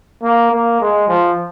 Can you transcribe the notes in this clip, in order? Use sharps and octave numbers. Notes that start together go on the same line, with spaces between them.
A#3
A#3
G#3
F3